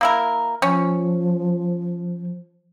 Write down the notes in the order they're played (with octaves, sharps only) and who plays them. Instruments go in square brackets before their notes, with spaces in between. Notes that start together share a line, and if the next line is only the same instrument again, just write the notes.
[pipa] A#3 E4 A#4
[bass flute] F3 [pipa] C#4